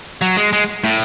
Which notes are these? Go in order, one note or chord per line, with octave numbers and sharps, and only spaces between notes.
F#3
G#3
G#3
A2